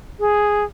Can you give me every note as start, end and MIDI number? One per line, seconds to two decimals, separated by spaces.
0.20 0.64 68